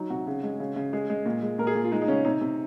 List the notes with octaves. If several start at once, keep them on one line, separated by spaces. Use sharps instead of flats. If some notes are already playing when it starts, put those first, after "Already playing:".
Already playing: F#3 D#4
C3 F#4
C#3
G#3
C#3
C#3
G#3 G#4
G#3
A#2
G#3
A#2 A#4
G#4
A#2
F4
G#3 D#4
D#4
C#3 C#4
C3 D#4
C3